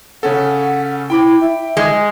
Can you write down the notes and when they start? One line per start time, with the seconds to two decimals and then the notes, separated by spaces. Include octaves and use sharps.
0.23 C#3 C#4 A4 F#5
1.10 E4 G5 B5 D6
1.41 E5
1.77 G#3